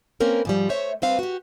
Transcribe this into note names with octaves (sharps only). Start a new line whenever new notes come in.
A#3 C4 C#4 A#4 B4
G#2 F3 G3
A3 C5 C#5 E5
D2 G3 C4 B4 F5
F#4 G4